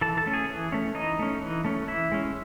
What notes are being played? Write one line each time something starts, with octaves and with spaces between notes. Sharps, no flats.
E3 A4 A5
A4 A5
A3 C#4
G#4 G#5
E3
A3 C#4
E3 D#4 D#5
A3 C#4
E3
A3 C#4
E3 E4 E5
G#3 C#4